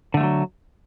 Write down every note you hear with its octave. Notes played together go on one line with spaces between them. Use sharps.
D3 F3 F#3 A3